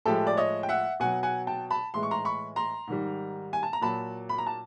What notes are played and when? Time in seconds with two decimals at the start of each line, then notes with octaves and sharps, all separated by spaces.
0.06 A2 F3 G#3 G4 A4
0.27 D5
0.37 C#5 D#5
0.63 G5
0.69 E5 F#5
1.00 B2 F#3 F#5 G#5
1.23 F#5 G#5
1.47 G5 A5
1.71 A5 B5
1.94 A2 E3 G#3 C6
2.03 C#6
2.11 A#5 C6
2.25 B5 C#6
2.56 A#5 C6
2.87 G#2 D#3 G3
3.53 G#5
3.63 A5
3.73 A#5
3.81 A#2 F#3 A5 B5
4.29 B5
4.38 A#5
4.47 A5